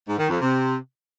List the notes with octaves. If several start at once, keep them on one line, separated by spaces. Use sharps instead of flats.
G#2
D#3
F2
C3